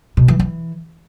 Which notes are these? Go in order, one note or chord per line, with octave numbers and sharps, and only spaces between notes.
B2
E3
E3